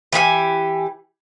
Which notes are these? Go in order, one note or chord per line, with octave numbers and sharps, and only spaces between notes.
E3 G4 G#4 G#5